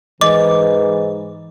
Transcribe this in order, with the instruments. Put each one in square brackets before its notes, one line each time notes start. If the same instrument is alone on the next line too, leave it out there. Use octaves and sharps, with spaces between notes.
[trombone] G#2 [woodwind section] E3 [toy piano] D#5 [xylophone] D6